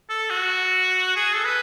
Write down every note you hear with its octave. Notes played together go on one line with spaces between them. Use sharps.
A4
F#4
G#4
A4
B4